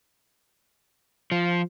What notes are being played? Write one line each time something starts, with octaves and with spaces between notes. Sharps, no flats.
F3